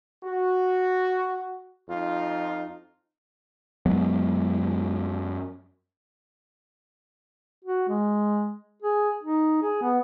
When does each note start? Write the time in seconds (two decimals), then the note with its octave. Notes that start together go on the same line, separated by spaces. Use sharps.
0.23 F#4
1.89 F2 D#4 F4
3.86 F#2 F#3 G#3 B3
7.65 F#4
7.89 G#3
8.82 G#4
9.23 D#4
9.62 G#4
9.82 B3